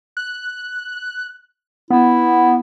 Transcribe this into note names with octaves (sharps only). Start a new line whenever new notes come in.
F#6
B3 E4